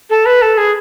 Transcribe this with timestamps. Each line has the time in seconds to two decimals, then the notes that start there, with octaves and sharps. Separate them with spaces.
0.10 A4
0.26 B4
0.42 A4
0.57 G#4